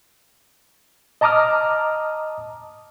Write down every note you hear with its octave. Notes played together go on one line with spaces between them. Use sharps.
D#5 A5 A#5 D6 D#6 F6